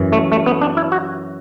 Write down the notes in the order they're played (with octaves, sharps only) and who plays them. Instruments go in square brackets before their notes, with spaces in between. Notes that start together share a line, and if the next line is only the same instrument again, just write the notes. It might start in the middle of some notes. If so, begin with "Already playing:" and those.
Already playing: [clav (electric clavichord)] F#2 E3
A3
A3
B3
D4
E4
F#4